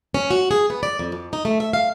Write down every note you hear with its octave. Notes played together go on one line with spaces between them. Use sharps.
C#4
F#4
G#4
B3
D5
F2
F2
D#4
A3
E5
F5